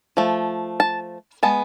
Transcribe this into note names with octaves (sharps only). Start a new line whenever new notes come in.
F3 A3
A5
G#3 B3 A5